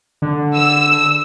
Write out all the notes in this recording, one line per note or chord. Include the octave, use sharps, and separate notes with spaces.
D3
E6